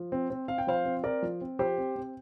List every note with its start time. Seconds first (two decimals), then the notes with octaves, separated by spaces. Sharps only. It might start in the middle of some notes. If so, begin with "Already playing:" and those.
Already playing: F3
0.12 C4
0.30 C4
0.48 C4 F5
0.58 G5
0.67 F3 C5 F5
0.85 C4
1.04 C4 A#4 D5
1.22 F3
1.41 C4
1.59 F3 G4 C5
1.78 C4
1.96 C4